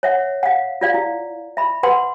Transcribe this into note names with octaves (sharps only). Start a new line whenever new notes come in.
C#5 E5 F#5
F5 F#5
F4 D5 F5
E4
E5 B5
B4 F#5 C6